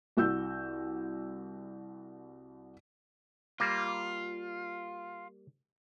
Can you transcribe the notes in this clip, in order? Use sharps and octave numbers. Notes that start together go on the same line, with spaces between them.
C2 F#4 E6 G6
G3 A#3 F4